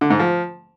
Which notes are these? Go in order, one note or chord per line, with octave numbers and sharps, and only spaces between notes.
D3
G#2
F3